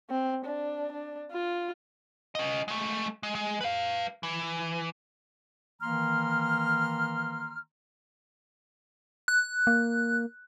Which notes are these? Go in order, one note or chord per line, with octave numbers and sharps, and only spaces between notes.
C4
D4
D4
F4
C#4 D#5
G#3 A3
G#3
G#3
B4 F5
E3
D#3 E3 A#3 A#5 C6 F6
F#6
A#3